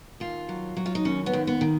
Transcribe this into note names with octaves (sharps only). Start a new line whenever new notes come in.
D#2 F4
F#3
F#3
F4
D#4
D#2 C#4
B3
D#2
B3
D#3